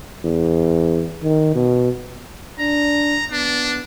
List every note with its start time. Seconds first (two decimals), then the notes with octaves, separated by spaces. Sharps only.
0.25 E2
1.23 D#3
1.55 B2
2.59 D4 A#5
3.31 B3 D4